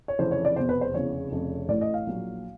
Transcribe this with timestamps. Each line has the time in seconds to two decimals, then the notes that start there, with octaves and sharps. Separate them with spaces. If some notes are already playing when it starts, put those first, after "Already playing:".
0.08 C#5
0.19 F1 F2 C#3 E3 C5
0.31 C#5
0.45 D5
0.56 F1 E2 B2 C5
0.69 B4
0.81 C5
0.94 F1 E2 C#3 C#5
1.31 F1 F2 C#3
1.68 A1 A2 E3 D5
1.81 D#5
1.94 F5
2.06 A#1 A#2 F#3